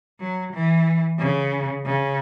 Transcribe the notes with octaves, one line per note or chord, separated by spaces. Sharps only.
F#3
E3
C#3
C#3